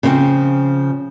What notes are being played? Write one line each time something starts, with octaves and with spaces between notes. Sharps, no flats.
C#3 F3 C4